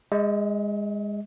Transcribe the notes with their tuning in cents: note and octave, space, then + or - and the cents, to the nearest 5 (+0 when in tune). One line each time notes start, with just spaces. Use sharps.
G#3 -20 D#5 +45